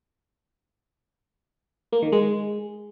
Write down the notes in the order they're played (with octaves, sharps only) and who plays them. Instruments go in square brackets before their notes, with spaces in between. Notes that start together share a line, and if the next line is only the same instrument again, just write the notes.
[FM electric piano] A#3
D#3
G#3